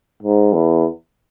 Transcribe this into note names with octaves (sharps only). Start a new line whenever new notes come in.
G#2
E2